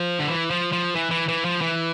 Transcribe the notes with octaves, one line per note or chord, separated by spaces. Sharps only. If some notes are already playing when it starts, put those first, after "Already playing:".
Already playing: F3
D3
E3
F3
F3
E3
E3
E3
F3
E3